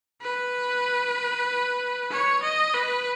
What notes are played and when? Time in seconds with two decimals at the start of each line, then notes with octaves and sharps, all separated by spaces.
0.21 B4
2.11 C#5
2.43 D#5
2.74 B4